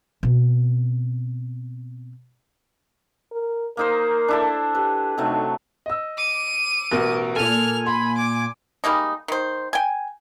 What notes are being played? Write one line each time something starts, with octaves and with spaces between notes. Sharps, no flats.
B2 C4
A#4
A#3 D#4 A#4 C5
D4 E4 A4
G4 B4
C3 F#3 A3 D#4
D#5 E6
D6 C#7 D#7
A1 B2 A#4
A#2 A4 G#5 F6 F7
B5 C6
D6
G3 G#3 A#3 D#4
D#3 C5
G5 G#5